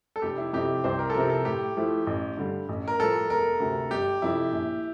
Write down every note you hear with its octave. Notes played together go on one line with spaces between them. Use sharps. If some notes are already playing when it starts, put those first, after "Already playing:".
A4
F1 G4
E4
F2 C3 G4
C2 C5
A#4
A4
C3 F3 A#4
A4
A2 G4
F3 A3 E4
A1
G2 D3 G3
A1
A#4
A2 F3 A4
E1 A#4
D2 C3
G1 G4
F2 C3 F3 E4
A#1